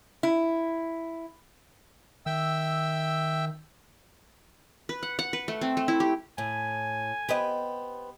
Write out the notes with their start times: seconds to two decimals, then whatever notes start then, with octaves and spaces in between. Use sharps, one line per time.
0.23 E4
2.26 D#3 E5 G5 E6
4.89 B4
5.03 F#5
5.19 F#5
5.33 B4
5.48 A3
5.61 C4
5.77 A3
5.88 E4
6.00 G4
6.38 A2 G#5
7.29 B3 G4 C5 D#5 G5